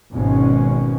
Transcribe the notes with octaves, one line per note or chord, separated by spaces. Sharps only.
G#1 B2 G#3 C#4